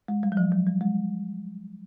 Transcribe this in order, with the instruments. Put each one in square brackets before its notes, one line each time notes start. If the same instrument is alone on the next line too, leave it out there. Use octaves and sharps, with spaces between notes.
[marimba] G#3
G3
F#3
F3
F#3
G3
G#3